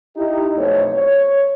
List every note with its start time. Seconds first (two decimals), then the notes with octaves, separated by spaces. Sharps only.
0.16 D#4 E4 G4
0.56 B1 F2 A3 C5 C#5
0.93 C#5